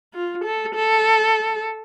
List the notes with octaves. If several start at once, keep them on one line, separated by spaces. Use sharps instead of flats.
F4
A4
A4